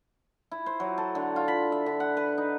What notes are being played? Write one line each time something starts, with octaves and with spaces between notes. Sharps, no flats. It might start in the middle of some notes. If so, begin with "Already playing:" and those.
E4
C5
F#3
A4
D3
F4
B5
E5
D3
F#5
B4
D#4